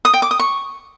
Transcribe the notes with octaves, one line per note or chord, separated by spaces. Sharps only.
D#6
G5
D6
D#6
C#6